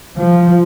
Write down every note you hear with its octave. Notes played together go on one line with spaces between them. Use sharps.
F3